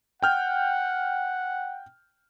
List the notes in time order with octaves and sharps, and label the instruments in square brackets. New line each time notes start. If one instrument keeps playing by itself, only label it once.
[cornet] F#5 [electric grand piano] G5 F6 G6